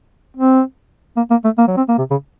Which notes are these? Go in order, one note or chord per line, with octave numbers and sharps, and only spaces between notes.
C4
A#3
A#3
A3
A#3
F#3
C4
A#3
C3
C#3